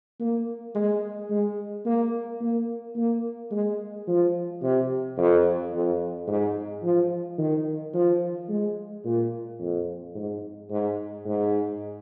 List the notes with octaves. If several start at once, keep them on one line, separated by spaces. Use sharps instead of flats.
A#3
G#3
G#3
A#3
A#3
A#3
G#3
F3
C3
F2
F2
G#2
F3
D#3
F3
G#3
A#2
F2
G#2
G#2
G#2